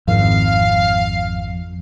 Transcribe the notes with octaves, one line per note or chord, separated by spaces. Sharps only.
G#1 F2 F5